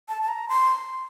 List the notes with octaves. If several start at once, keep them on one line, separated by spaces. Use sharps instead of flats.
A5
A5
A#5
C6